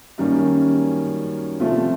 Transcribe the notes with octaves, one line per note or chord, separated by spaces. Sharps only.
F#2 D#3 G3 A#3 C#4
C3 F3 A3 C4 F4